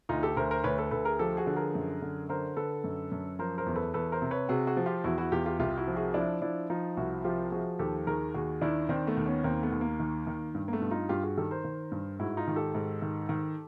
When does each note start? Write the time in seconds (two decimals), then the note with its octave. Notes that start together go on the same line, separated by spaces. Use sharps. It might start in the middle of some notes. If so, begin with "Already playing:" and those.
0.09 D2 D#4 F4
0.23 G4 A4
0.37 D2 A#4 C5
0.51 A#4 C5
0.64 D2 B4 C#5
0.78 A4 B4
0.91 D2 A4 B4
1.05 G#4 A#4
1.19 F3 G4 A4
1.37 F#4 G#4
1.47 D3
1.56 G#4 A#4
1.75 F#2
2.02 D3
2.29 D3 A#4 C5
2.57 D3 A4 B4
2.84 F#2
3.12 F#2
3.39 F3 A#4 C5
3.58 A#4 C5
3.66 E2
3.76 A4 B4
3.94 E2 A4 B4
4.12 A#4 C5
4.22 C3
4.31 B4 C#5
4.49 C3 F#4 G#4
4.67 F#4 G#4
4.77 F3
4.86 F4 G4
5.04 E2 E4 F#4
5.18 E4 F#4
5.32 E2 F4 G4
5.46 F4 G4
5.59 C2 F4 G4
5.77 E4 F#4
5.87 F3
5.96 F#4 G#4
6.14 F3 D4 E4
6.42 F3 D4 E4
6.70 F3 D#4 F4
6.97 C2 E4 F#4
7.24 F3 F4 G4
7.52 F3 F#4 G#4
7.79 D#2 G4 A4
8.07 D#3 G#4 A#4
8.34 D#2 F#4 G#4
8.61 D#3 D4 E4
8.89 D#3 C4 D4
9.07 A3 B3
9.17 D#2
9.26 B3 C#4
9.44 D#2 A#3 C4
9.63 A3 B3
9.72 D#2
9.81 A#3
10.00 D#3
10.27 D#3
10.55 G2
10.68 A#3
10.73 A3 B3
10.82 G2
10.91 D#4 F4
11.09 G2 F4 G4
11.23 F#4 G#4
11.37 D#3 G4 A4
11.51 A#4 C5
11.64 D#3
11.92 G2
12.19 G#2 E4 F#4
12.37 D#4 F4
12.48 D#3
12.56 G4 A4
12.75 G#2
13.02 D#3
13.29 D#3